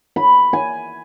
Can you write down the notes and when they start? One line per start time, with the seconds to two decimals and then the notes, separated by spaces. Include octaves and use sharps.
0.16 B5
0.53 G#5